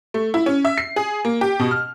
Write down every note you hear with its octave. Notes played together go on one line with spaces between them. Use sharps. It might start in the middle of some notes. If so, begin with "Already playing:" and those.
A3
E4
C#4
E5
C7
G#4
A#3
G4
B2
F6